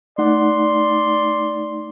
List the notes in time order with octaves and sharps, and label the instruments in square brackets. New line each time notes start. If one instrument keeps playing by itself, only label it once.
[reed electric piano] A3 D#4 F#5 [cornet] D5 [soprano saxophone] C6